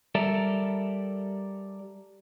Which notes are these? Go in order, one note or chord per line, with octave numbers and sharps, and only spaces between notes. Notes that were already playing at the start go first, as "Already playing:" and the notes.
G3 A4 A#4 D5 E5